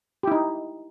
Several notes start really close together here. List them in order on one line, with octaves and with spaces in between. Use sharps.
G4 E4 D#4